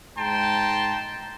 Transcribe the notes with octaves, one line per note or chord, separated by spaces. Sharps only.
G#2 G5 A5 A#5 C6